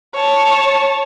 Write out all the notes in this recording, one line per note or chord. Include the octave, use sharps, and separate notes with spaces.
C#5 A5